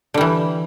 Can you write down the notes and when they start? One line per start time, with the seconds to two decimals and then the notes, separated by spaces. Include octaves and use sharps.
0.14 D3
0.18 G3
0.21 E3